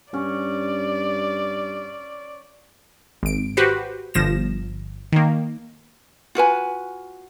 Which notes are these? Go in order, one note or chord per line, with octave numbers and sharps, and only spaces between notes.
G2 C#4 D5
G#1 D7
F#4 G4 B4 C5
G1 F3 A#6 E7
D#3 A#3
F4 F#4 B4 G#5